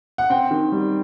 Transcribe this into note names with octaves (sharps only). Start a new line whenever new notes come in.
F#5
C4 G5
D#3
G3